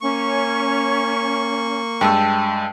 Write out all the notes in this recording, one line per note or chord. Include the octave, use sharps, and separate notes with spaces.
A#3 C#4 C#6
G2 G#3 G5 A5 E6